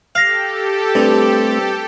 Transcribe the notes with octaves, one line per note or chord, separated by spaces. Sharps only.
G4 A4 F5 F6 A#6 C7
G2 A3 C4